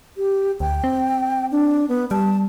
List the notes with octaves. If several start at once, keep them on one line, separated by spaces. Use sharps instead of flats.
G4
D2 G5
C4
D4
B3
G3 A5